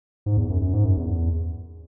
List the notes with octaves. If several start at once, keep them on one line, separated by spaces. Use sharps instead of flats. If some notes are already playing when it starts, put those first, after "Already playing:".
G#2
E2
F#2
F#2
G#2
F#2
E2